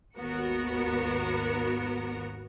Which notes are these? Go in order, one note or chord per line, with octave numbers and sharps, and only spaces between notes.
G#1 D#2 B3 F#4 A#4 C#7